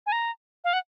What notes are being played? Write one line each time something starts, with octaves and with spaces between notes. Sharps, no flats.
G#5
A#5
F5
F#5